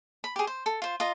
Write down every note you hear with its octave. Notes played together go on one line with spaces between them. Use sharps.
B5
G4 G#4
C5
A4
F4 C5
F4 D#5 A#5